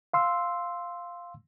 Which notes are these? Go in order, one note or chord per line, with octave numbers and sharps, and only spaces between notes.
F5 C6 E6